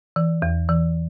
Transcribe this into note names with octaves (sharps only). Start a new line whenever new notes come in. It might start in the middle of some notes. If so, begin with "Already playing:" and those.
E3
E2
E3